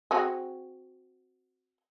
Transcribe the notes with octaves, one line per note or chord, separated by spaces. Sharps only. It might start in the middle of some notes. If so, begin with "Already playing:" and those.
C4 F#4 G#4